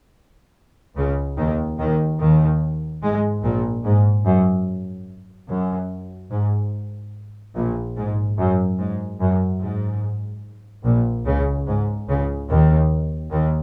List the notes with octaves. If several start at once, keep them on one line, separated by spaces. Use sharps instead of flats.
C#2 C#3
D#2 D#3
D#2 D#3
D#2 D#3
G#2 G#3
A#1 A#2
G#2
F#2
F#2
G#2
A#1 A#2
G#2
F#2
G#2
F#2
G#2
A#1 A#2
C#2 C#3
G#2
C#2 C#3
D#2 D#3
D#2 D#3